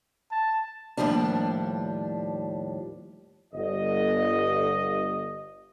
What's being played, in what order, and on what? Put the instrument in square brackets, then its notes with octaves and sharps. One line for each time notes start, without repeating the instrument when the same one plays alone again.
[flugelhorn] A5
[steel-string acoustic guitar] D#2 A2 F3 G3 D4
[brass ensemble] G1 D#5